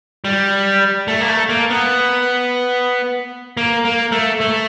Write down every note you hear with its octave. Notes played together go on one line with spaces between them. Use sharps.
G3
A3
A#3
A3
A#3
B3
A#3
A#3
A3
A3